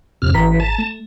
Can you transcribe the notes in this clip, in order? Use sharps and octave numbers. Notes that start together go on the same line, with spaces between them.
F2 C3 F6
G#1 E3 A#5 B6
A5
A3